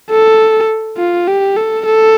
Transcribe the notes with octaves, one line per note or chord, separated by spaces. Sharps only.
A4
F4
G4
A4
A4